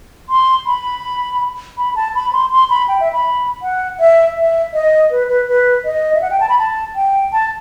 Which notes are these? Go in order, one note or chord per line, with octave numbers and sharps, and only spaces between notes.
C6
B5
B5
A5
B5
C6
C6
B5
G5
E5
B5
F#5
E5
E5
D#5
B4
B4
B4
D#5
E5
F#5
G5
A5
B5
A5
G5
A5